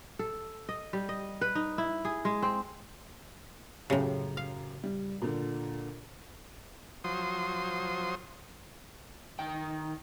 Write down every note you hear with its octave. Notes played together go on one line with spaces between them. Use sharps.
A4
D#5
G3
D#5
B4
D#4
E4
G#4
G#3
C4
F#2 A2 C#3 G4
F5
G3
A#2 D3
F3 F#3 C5 C6 D#6
D#3 G5